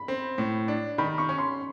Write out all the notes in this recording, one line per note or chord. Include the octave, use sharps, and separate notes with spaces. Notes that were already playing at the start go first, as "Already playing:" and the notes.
Already playing: B5
C4
A2
D4
D#3 B5
C#6
C#4
C6